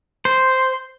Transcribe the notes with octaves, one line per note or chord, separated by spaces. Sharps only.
C5